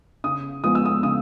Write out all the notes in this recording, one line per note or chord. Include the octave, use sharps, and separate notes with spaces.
C#3 D#6
F3 G#3 B3 D#6
E6
D#6
C#3 D#6